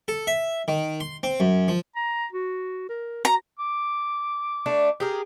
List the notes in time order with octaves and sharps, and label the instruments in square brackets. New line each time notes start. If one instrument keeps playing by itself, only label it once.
[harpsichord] A4
E5
D#3
C6
C4
F#2
F3
[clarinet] A#5
F#4
A#4
[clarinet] F#4 [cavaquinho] A#5
[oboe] D6
[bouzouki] A3 D4
G4 G#4 A#4